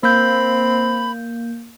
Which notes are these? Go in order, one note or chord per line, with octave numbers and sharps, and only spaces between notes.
A#3 C4 B5 G6